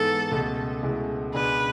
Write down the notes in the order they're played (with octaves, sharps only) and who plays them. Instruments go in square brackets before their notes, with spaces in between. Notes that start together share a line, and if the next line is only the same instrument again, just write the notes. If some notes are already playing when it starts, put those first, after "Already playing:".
Already playing: [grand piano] G#2 E3 B3 [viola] A4
[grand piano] C#2 B2 A3
C#2 B2 A3 E4 G#4
[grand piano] C#2 B2 G#3 D4 G#4 [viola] B4